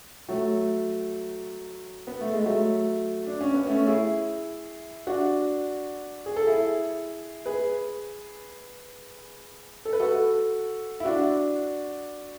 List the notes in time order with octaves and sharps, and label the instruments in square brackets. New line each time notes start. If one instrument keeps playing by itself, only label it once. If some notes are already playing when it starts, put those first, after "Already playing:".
[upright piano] F#3 A3
B3
A3
G#3
F#3 A3
D4
C#4
B3
A3 C#4
E4 G#4
D4 F#4
G#4
A4
E4 G#4
G#4 B4
A4
B4
F#4 A4
E4
D4 F#4